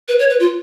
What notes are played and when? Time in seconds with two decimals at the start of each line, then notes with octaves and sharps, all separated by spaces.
0.08 B4
0.19 C#5
0.30 B4
0.40 F4